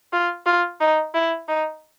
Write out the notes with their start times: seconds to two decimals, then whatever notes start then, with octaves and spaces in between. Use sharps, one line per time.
0.13 F4
0.46 F4
0.81 D#4
1.14 E4
1.48 D#4